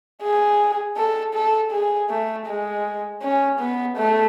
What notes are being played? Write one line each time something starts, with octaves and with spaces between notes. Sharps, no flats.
G#4
A4
A4
G#4
A3
G#3
C#4
B3
A3